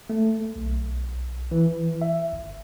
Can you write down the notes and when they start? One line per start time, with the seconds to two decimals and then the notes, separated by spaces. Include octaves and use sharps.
0.10 A3
0.56 B1
1.51 E3
2.02 E5
2.33 G1